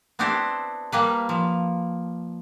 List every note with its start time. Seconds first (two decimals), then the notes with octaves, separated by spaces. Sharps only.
0.19 B3 C4 D4 E4 G4 C5
0.92 G3 A#3 B4
1.29 F3